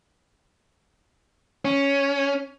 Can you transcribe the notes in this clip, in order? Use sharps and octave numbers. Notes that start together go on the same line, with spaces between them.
C#4